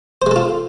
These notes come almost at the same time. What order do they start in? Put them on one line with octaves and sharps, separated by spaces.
C5 G#3 A4 F4